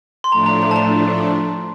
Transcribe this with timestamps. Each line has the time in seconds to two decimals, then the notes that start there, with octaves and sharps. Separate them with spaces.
0.24 C6
0.32 A2 F3 A3 D4 A#5
0.46 A#5
0.62 A#5
0.71 A5
0.76 A#5